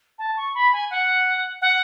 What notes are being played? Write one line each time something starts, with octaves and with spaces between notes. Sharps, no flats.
A5
C#6
B5
G#5
F#5
F#5